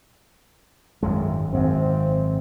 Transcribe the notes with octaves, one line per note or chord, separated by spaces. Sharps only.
G#1 F#2 G#3
G#1 F#2 C4